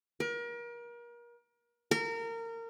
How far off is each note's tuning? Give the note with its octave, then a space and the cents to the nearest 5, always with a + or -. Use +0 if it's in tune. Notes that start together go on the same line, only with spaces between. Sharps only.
A#4 +35
A#4 -25